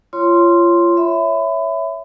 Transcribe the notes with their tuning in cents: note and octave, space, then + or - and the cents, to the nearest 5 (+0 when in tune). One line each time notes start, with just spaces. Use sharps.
F4 -25 C#5 +0 C6 +0
C#5 +0 E5 +0 B5 +30